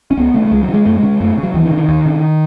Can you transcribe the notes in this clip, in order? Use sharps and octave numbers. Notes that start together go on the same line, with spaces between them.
C#4
C#2 B3
C#3 A3
A3
C#2 G#3
F#3
C#3
G#3
F#2 A3
G#3
C#3
F#2 A3
C#3
F#3
D#2 E3
D#3
C#3
D#3
D#2
C#3